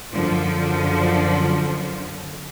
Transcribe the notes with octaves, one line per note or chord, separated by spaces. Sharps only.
F#2 D3 F3